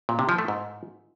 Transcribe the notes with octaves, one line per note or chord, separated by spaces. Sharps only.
A#2
C3
F3
A3
G#2